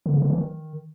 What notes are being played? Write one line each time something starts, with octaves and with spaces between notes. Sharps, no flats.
D3
C#3
D3
E3
D#3